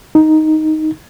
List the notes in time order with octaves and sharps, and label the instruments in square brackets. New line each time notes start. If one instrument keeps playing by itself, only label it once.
[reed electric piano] D#4